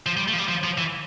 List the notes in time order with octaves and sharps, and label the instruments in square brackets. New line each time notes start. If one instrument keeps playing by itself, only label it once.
[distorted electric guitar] F3
G3
A3
F3
G3
F3
F3
E3